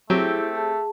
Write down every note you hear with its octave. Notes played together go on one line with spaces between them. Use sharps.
F#3 A3 C4 E4 G4 G#4
G#4 A5